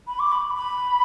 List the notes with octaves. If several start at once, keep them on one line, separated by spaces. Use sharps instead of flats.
B5
D6
B5
B5